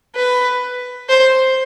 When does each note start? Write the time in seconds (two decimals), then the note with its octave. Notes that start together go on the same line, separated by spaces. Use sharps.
0.15 B4
1.09 C5